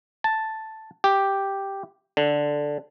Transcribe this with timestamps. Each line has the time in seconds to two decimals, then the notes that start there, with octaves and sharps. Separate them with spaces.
0.24 A5
1.04 G4
2.17 D3